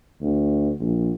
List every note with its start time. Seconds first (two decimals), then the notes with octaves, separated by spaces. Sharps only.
0.22 D2
0.80 A#1